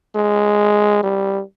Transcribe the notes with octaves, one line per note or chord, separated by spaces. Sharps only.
G#3
G3